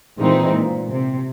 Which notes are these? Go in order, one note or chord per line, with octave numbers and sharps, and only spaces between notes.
A#2 D#3 E3 G#3 C4 D#4
A#2
C3